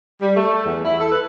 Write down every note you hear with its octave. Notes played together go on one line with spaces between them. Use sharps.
G3
A3
E2
E4
A4
B4